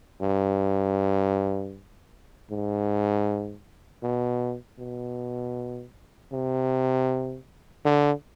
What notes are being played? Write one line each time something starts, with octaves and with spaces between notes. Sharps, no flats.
G2
G#2
B2
B2
C3
D3